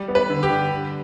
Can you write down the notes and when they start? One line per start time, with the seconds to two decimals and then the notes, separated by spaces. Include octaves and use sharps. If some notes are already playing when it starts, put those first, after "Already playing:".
Already playing: G3
0.08 B3
0.15 B4
0.29 D3
0.43 G4
0.50 D3
0.71 G3